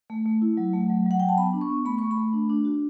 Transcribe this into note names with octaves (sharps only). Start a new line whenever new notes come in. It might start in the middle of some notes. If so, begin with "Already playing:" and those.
A3
A3
E4
F#3
A3
F#3
F#3 F#5
F#3 G5
A5
B3 B5
D4
C#6
B3
A3 B5
A3 C#6
B5
A3
D4
D4
F#4